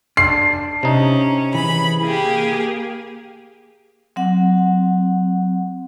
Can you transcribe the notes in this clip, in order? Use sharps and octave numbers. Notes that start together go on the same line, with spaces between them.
D4 C7
C3 C#4 D#4
E3 G#4 B5
A#3 G4 G#4
F#3 C4 F#5